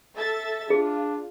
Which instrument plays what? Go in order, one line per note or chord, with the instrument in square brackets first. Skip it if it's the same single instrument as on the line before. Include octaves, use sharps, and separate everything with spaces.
[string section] A4 E5 A6
[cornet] D4 [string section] F4 [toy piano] G#4